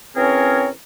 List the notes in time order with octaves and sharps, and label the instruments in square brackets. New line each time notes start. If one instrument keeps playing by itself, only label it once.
[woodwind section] E3 C4 C#4 G#4 A#4 C#5